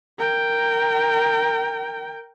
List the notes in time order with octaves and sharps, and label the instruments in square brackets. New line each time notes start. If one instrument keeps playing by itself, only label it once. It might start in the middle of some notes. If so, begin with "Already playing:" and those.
[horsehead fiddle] A#4 G5